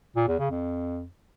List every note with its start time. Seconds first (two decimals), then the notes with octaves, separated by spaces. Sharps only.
0.16 A#2
0.28 E2
0.39 C#3
0.51 F2